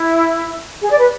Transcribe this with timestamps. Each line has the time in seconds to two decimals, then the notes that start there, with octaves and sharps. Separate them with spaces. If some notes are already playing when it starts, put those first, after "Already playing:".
Already playing: E4
0.82 G#4
0.90 D5
0.99 B4